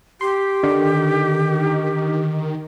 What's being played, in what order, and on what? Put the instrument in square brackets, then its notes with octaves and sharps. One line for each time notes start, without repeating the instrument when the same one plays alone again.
[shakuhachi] G4 [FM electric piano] C6
[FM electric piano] D3 [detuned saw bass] D#3